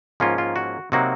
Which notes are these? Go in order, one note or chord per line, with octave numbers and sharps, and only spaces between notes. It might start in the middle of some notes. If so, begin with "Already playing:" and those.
G#2 F3 A#3 C#4 F4
F4
F#4
C3 F#3 A#3 D#4 F#4